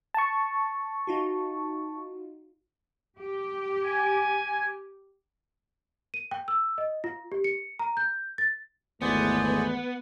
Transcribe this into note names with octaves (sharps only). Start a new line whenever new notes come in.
A5 C#6
D#4 F4 F#4
G4
G#5
D#7
G5
E6
D#5
F4
G4
C#7
A#5
G6
A6
G#1 E2 A3 B3 G#4 C5 D5